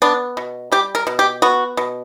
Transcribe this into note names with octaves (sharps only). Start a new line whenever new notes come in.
B3 D4
B2
G3 G4
A#4
B2
G4
B3 F#4
B2